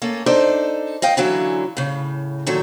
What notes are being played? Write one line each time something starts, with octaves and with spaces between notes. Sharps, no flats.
A3 A#3 C#4 A4
D4 D#4 A4 C5 D5
D#5 F5 G5
D3 E3 F#3 C#4 E4 F5
A2 C#3
A#2 D#3 F#3 A4